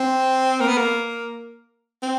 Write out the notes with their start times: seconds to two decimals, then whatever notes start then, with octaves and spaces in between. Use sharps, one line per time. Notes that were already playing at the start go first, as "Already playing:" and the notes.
Already playing: C4
0.60 A#3
0.68 B3
0.77 A#3
2.02 C4